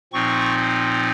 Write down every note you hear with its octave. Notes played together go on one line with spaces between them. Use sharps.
A#2 F3 C4 D#4 C#6